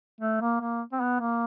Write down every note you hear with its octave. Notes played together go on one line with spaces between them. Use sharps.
A3
A#3
A#3
C4
B3
A#3